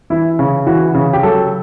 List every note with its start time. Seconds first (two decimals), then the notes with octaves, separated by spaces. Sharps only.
0.10 E3 E4
0.39 C#3
0.67 E3 F#4
0.94 C#3
1.13 G4
1.23 F#3 A4